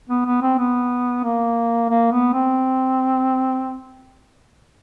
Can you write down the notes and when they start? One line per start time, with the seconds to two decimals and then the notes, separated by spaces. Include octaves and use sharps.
0.09 B3
0.26 B3
0.42 C4
0.59 B3
1.24 A#3
1.89 A#3
2.12 B3
2.33 C4